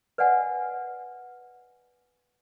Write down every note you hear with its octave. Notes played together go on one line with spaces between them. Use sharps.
B4 D5 D#5 F#5 G#5